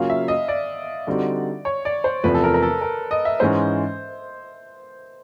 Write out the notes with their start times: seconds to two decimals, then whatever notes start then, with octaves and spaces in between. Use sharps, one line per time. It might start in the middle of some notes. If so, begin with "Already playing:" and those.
Already playing: C#3 F#3 A#3 C#4 F4 F5
0.10 E5
0.28 D#5
0.48 D5
1.07 D3 G3 C4 D#4 F#4
1.65 C#5
1.85 D5
2.04 C5
2.24 E2 C3 F3 A3 B4
2.34 A4
2.44 A#4
2.54 A#4
2.63 A4
2.82 A#4
3.11 D#5
3.25 E5
3.40 G#2 E3 G#3 C#4 C5